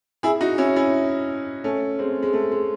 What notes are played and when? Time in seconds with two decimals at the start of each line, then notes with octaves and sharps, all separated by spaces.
0.23 E4 G#4
0.41 D#4 F#4
0.58 C#4 E4
0.76 C#4 E4
1.64 A3 C#4
1.99 G#3 C4
2.23 G#3
2.33 A3
2.52 G#3